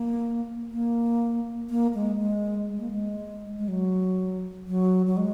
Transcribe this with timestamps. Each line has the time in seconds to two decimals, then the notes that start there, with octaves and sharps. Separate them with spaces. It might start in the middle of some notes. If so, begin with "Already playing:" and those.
Already playing: A#3
0.70 A#3
1.70 A#3
1.95 G#3
2.20 G#3
2.70 G#3
2.80 A#3
2.91 G#3
3.59 G#3
3.68 F#3
4.68 F#3
5.07 F#3
5.17 G#3